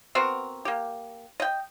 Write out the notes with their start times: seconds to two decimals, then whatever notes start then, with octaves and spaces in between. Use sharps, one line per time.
0.15 B3 C4 F#4 A#4
0.65 A#3 G4
1.40 D#5 G5